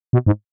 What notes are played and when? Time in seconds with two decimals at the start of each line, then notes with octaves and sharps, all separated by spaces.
0.13 B2
0.27 G#2